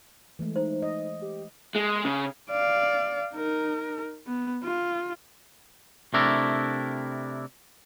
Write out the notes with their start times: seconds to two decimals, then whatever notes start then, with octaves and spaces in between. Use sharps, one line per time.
0.39 E3 G#3 A3
0.56 D#4 C5
0.82 D#5
1.22 G4
1.75 G#3
2.05 C#3
2.50 D5 F5
3.34 D#4 A#4
4.27 B3
4.64 F4
6.14 C3 A3 D4 E4 A#4